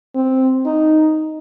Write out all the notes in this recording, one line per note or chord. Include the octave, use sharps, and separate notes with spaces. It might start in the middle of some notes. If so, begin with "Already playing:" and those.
C4
D#4